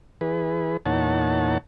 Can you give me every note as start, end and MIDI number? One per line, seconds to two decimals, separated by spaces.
0.21 0.77 52
0.21 0.77 68
0.21 0.77 71
0.86 1.58 40
0.86 1.58 46
0.86 1.58 63
0.86 1.58 73
0.86 1.58 78
0.86 1.58 81